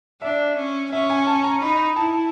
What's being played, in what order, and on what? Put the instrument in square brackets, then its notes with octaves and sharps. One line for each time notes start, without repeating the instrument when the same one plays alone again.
[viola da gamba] D4 [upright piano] E5
[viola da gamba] C#4
[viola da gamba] C#4 [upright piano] E5
[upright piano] G#5
A5
A#5
[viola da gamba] D#4 [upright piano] B5
[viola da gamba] E4 [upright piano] A5